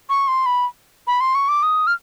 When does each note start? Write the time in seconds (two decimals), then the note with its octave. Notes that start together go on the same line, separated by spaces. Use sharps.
0.10 C#6
0.28 C6
0.46 B5
1.07 B5
1.21 C6
1.35 C#6
1.49 D6
1.63 D#6
1.87 F6